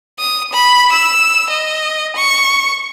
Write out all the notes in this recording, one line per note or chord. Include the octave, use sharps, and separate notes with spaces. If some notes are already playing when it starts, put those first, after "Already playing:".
D#6
B5
E6
D#5
C#6